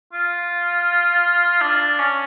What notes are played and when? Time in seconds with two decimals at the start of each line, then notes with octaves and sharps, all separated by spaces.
0.13 F4
1.61 D4
1.99 C#4